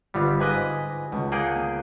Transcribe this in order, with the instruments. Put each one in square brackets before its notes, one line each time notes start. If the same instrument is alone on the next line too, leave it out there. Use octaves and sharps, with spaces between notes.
[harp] G1 F4 F5 [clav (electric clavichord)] G3 B3 C4
[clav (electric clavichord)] G#2 B4 D#5 [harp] G#5 D6 A#6
[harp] C#2 [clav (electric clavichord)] B2
[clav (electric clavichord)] A#3 G#4 G5 [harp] F#5
[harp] B3